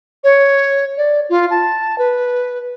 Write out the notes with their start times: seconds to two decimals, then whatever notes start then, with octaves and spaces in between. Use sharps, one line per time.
0.24 C#5
0.97 D5
1.29 F4
1.50 A5
1.98 B4